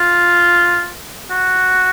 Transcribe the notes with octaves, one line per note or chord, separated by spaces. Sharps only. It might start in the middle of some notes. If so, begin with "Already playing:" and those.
Already playing: F4
F#4